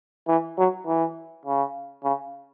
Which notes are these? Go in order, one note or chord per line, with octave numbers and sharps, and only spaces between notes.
E3
F#3
E3
C#3
C#3